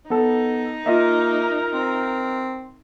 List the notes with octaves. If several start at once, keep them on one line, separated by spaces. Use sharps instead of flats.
B3 D#4 A4
A#3 F4 A#4 D#5 E5
C4